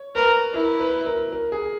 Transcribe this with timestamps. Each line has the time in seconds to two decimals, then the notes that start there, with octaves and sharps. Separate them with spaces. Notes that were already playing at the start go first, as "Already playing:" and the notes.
Already playing: C#5
0.15 A#4 B4
0.54 E4 A#4
0.80 B4
1.06 A#4
1.32 A#4
1.52 G#4